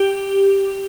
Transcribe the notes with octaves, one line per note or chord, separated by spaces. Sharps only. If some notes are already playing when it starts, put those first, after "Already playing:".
Already playing: G4